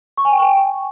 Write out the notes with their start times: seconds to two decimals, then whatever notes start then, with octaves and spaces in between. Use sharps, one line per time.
0.17 C#6
0.25 G#5
0.32 G5